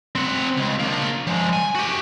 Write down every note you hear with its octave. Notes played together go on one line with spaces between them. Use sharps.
C4 F#5
C#2
A#3 D4
F3 G#3
G#5
F#4 G4